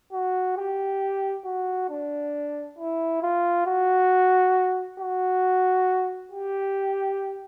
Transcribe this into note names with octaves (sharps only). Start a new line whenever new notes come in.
F#4
G4
F#4
D4
E4
F4
F#4
F#4
G4